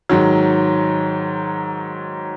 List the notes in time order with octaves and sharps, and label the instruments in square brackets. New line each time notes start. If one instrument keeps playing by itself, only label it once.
[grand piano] G#2 D#3 F#3